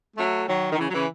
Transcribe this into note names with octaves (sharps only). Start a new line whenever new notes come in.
F#3 A3
D#3 F#3
D#3
C#3 E3
F#3
C#3 E3